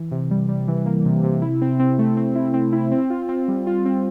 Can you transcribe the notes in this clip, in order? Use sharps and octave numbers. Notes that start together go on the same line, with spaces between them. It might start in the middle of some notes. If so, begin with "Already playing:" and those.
Already playing: E3
C3
G3
G3
E3
A#3
C3
C3
E4
C4
C4
A3
C4
E4
C4
E4
C4
F4
C4
G3
F4
C4